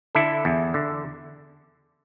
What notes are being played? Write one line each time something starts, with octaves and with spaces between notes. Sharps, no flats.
D3 E4 A4
E2
D3